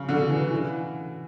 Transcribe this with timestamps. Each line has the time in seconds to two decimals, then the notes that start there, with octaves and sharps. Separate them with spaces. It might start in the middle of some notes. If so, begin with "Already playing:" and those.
Already playing: C#3
0.09 D3
0.30 E3
0.51 E3